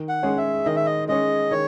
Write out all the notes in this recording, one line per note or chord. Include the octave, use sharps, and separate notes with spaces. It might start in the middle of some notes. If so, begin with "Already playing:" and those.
Already playing: D#3
F#5
G#3 C#4 G#4 C#5
E5
D#3 D#5
E5
D#5
G#3 C#4 G#4 C#5 D#5
D#3 C#5